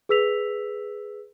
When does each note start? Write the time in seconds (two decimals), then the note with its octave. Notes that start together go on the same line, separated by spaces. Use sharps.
0.09 G#4 B4 E6 B6 F7